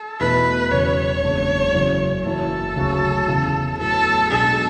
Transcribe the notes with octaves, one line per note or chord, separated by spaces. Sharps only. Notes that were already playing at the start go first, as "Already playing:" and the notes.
Already playing: A4
E2 B2 A3 E4 B4
E1 E2 C#3 F#3 C#4 C#5
F#1 E2 C#3 G#3 D4
F#2 C#3 E3
F#1 F#2 E3 A4
D2 C#3 F#3 C#4 F#4
E2 C#3 E3
A2 F#3 B3 A4
B1 B2 G#3 D4 A4